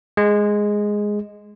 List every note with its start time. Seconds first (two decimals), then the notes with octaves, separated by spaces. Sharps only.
0.17 G#3